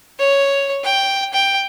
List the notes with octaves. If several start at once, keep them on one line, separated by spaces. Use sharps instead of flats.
C#5
G5
G5